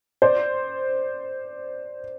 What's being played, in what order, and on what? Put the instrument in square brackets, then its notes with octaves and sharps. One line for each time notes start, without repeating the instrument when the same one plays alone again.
[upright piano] C5 D5